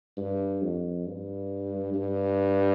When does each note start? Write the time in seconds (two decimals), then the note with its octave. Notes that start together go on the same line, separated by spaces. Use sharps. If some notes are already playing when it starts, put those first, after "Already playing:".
0.17 G2
0.62 F2
1.06 G2
1.94 G2